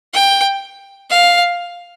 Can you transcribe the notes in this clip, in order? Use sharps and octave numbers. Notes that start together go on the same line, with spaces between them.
G5
F5